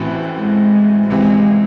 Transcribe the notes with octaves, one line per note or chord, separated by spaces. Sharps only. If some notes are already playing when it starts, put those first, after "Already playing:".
Already playing: A1 A2 E3 C4 F#4
G#3
C#2 C3 E3 G#3 C4